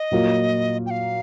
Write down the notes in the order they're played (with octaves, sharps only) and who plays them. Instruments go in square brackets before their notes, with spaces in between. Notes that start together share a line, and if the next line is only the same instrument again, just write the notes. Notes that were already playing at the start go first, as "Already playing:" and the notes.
Already playing: [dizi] D#5
[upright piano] A#2 F#3 A#3 F4
[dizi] G5
F5